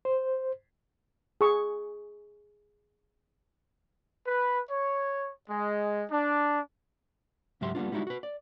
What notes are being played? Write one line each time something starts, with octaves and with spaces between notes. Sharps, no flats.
C5
G#4 C#6
B4
C#5
G#3
D4
C#2 G#2 F#3 G4 E5 C6
G3 A#3 B3 D4 F4
G3 G#3 D#4 E4 F#4
F#4 B4
D5